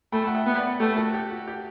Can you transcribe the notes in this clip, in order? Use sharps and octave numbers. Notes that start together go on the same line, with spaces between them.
A3 G5 B5
F#5
E5 G5
B3
D5 F#5
A3 G4 B4
F#4 A4
G4
F#4
G4